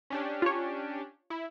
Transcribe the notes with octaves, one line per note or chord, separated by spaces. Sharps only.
C#4 D4 G4
F4 C#5
E4